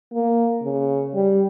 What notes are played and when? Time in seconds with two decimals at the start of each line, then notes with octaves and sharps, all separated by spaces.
0.13 A#3
0.62 C#3
1.14 G3